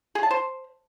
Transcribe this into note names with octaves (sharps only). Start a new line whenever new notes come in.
G#4
A5
C5